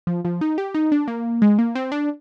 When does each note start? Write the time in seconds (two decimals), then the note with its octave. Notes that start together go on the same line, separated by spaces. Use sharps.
0.07 F3
0.25 F3
0.41 D#4
0.58 G4
0.74 D#4
0.92 D4
1.08 A#3
1.42 G#3
1.59 A#3
1.75 C4
1.92 D4